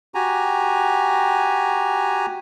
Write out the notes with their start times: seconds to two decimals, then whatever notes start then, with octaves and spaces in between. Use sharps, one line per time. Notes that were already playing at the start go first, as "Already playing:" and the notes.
0.15 F#4 G4 G#5 A#5